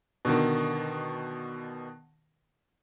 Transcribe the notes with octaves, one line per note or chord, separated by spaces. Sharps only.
B2 D3 D#3